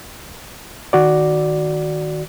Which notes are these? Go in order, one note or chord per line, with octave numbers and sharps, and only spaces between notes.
D#3 F#4 D5